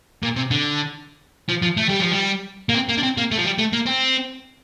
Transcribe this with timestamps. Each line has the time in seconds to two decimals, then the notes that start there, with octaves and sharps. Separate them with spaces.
0.23 A#2
0.37 C3
0.51 D3
1.49 F3
1.62 F3
1.77 A3
1.89 G3
2.00 F3
2.12 G3
2.69 A#3
2.74 C4
2.89 A#3
2.98 D4
3.03 C4
3.18 A#3
3.32 A3
3.38 F3
3.45 G3
3.59 A3
3.73 A#3
3.86 C4